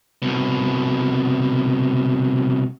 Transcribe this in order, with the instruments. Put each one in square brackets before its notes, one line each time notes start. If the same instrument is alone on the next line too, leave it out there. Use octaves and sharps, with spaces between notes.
[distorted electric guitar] C2 B2